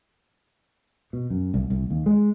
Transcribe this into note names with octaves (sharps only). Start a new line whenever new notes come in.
B2
F#2
C2
C2
D#2
G#3